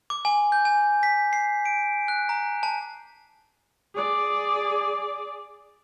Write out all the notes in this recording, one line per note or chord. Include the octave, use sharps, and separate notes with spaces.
D6
G#5
G6
G#5
B6
C7
D7
F#6
A#5
A5
G#4 D5